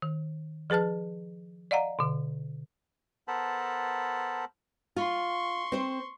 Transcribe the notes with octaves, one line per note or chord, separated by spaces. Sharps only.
D#3
F3 G#4 B4 A5 F6
D5 D#5 F5 F#5 A#5
B2 D3
B3 A4 A#4 C5 A5 B5
F4 C6 C#6
C4 C5